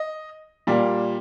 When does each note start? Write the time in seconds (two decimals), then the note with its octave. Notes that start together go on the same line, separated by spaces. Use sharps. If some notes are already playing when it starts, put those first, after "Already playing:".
Already playing: D#5
0.67 A#2 G3 A#3